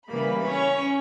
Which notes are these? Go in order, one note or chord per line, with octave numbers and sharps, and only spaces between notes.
C#3 E3 G3 A#3 B4 B5
C#4 C#5